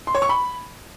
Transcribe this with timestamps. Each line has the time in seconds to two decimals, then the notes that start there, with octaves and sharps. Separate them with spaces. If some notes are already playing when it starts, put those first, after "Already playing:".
0.07 C6
0.15 C#5
0.22 C#6
0.29 B5